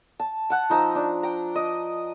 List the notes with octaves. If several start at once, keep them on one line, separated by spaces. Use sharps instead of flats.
A5
F#5 A5
F3 D#4 A#5 E6
D4
G5 A#5
D#5